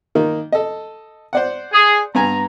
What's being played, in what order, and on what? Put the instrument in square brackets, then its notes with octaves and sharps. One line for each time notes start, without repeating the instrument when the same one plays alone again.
[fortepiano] D#3 A#3 D#4
A4 D#5
C5 D5 F#5
[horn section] G#4
[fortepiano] G2 B3 G#5 [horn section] A#5